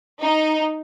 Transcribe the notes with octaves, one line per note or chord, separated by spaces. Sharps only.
D#4